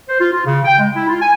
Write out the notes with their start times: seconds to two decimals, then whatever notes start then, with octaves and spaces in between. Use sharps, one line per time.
0.09 C5
0.20 F4
0.33 F4
0.45 C#3
0.65 G5
0.79 G#3
0.94 E4
1.08 F4
1.21 G#5